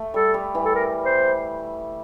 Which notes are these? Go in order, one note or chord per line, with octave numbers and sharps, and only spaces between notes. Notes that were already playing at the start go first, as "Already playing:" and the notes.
Already playing: A3
G3 A4
G3
E3
A4
A#4
C5